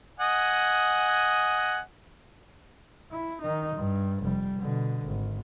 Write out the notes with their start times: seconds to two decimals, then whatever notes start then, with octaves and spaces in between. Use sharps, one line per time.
0.20 D#5 F#5 G#5
3.11 E4
3.42 D#3 D#4
3.75 G2
4.22 F1 G3
4.59 B2 D3
5.04 G#1